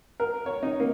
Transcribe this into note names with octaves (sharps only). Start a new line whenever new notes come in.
A#4
C#5
D#4
A#3